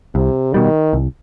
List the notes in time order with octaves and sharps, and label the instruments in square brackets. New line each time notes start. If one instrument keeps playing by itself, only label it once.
[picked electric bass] C2 [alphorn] C3
[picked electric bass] B2 G3 [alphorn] D#3
[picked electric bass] C2